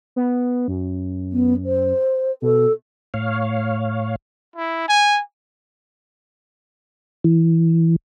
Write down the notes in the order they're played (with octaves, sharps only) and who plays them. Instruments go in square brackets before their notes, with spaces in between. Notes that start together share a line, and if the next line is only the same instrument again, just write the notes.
[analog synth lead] B3
F#2
[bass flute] B3
C5
[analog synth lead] B2 [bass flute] A4
[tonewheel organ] A2 C#5 F5
[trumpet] E4
G#5
[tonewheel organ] E3